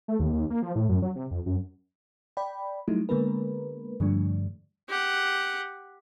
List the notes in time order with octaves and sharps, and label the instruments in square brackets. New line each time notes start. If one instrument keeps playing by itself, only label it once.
[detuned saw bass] A3
D#2
D#2
A#3
F3
A2
F#2
F#3
C3
F2
F#2
[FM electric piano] D5 G5 B5
F#3 G3 A3 D#4 E4
D3 G#3 A#3 B3 A#4 B4
G2 D3 F3 G3 A3 D4
[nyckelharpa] G4 F#5